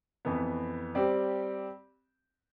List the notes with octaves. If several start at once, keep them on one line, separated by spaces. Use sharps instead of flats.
F2 E3 B3
G3 C4 G4 D5